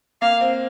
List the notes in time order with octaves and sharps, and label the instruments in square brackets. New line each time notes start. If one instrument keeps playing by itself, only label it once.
[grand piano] A#3 [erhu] F5
[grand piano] C4